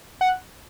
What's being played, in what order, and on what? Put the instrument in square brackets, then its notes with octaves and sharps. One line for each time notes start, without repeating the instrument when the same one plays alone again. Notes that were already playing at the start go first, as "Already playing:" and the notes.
[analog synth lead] F#5